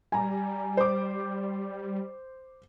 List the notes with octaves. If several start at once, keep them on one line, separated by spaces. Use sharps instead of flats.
G3 G#5 A#5
C5 D6